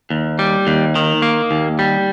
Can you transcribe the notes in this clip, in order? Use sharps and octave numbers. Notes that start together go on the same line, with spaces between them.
D#2
G3
D#2
D#3
A#3
D#2
G3